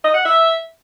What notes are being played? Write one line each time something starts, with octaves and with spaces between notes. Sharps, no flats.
D#5
F#5
E5